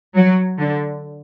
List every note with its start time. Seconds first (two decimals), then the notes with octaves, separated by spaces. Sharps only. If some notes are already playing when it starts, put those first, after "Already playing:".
0.15 F#3
0.59 D3